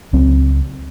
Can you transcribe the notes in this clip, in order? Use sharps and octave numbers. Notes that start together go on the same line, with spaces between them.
C#2 F#3 C4